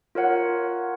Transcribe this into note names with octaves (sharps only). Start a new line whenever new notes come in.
F4 A#4 C#5 F#5